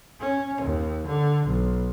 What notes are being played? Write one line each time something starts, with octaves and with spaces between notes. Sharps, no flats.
C#4
D#2
D3
B1